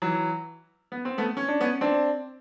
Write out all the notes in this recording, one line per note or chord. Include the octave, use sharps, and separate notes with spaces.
E3 F#3
B3
C4
A3 B3
C#4
D4
B3 C#4
C4 D4